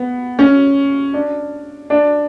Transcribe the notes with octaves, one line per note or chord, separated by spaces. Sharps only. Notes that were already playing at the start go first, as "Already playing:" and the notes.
Already playing: B3
C#4
D4
D4